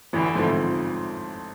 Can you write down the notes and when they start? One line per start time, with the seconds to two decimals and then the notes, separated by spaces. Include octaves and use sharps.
0.13 A1 D3 E3
0.35 G#2 F3 A3 C4